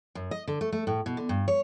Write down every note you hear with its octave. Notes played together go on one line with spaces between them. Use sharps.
F#2
D#5
D3
A3
A3
A2
B2
D3
G2
C#5